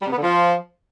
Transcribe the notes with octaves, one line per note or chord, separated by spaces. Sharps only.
G3
C3
B3
D3
F3